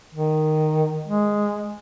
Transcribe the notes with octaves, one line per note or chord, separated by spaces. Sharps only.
D#3
G#3